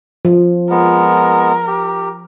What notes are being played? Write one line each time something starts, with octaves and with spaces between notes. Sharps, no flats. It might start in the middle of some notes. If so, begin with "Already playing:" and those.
F3
G#3 B3 A#4
G4